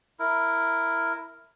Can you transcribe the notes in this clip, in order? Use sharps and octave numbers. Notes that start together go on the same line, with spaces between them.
E4 A#4